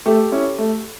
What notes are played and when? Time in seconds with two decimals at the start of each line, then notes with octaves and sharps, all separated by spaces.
0.06 A3 G4 A4
0.32 C#4 E4
0.58 A3